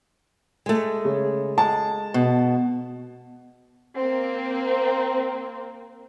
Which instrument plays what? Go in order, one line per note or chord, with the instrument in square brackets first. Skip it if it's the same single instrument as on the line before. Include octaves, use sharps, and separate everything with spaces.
[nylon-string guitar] G#3 A3
[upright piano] C#3
[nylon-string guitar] G#3 [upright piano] A5
[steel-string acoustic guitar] B2
[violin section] A#3 C4